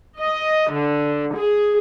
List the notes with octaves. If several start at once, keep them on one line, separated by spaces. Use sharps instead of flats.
D#5
D3
G#4